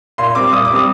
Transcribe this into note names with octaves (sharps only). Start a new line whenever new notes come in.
A#2 C6
G3 C4 D6
A#2 D#6
D6
G3 C4 D#6